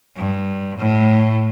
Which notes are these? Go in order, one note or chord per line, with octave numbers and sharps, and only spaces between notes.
G2
A2